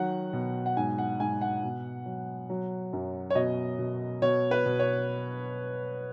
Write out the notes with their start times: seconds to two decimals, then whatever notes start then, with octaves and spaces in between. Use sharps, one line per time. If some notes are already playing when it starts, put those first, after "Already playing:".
Already playing: D#3 F#3 F#5
0.33 B2
0.66 F#5
0.76 G#2 G#5
0.98 F#5
1.20 G#2 G#5
1.41 F#5
1.63 B2
2.06 F#3
2.50 F#3
2.93 F#2
3.30 C#5
3.35 B2 D#5
3.78 B2
4.22 B2 C#5
4.51 B4
4.65 B2
4.79 C#5